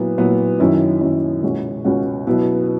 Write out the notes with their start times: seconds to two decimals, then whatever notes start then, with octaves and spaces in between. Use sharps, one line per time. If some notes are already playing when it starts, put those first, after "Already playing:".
Already playing: A#2 F#3 B3 E4
0.18 A#2 F#3 B3 E4
0.59 F#2 D#3 F#3 C#4 E4
1.01 F#2 D#3 F#3 C#4 E4
1.42 C#2 B2 G#3 C#4 F#4
1.85 C#2 B2 G#3 C#4 F#4
2.27 B2 F#3 B3 E4